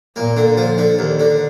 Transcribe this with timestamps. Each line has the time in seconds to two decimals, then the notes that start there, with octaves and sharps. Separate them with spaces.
0.16 A#2 A#3
0.37 D3
0.57 F3
0.78 D3
0.99 D#2
1.20 D3